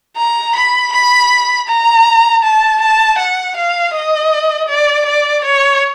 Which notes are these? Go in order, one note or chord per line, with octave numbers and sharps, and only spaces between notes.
A#5
B5
B5
A#5
A5
A5
F#5
F5
D#5
D5
D5
C#5